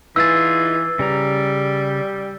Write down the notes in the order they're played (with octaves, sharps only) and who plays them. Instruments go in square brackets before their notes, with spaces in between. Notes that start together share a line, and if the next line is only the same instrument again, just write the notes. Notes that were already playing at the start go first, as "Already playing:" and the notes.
[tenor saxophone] E3 [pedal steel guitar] D#4 F4 G#4 [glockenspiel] E6 A6
[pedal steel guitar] C#3 A#5 [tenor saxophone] G3